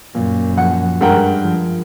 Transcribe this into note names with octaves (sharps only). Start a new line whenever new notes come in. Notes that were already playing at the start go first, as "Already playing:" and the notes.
F#2 A#2
F3 F#5
G2 G#3 A#4 F#5 G5
F3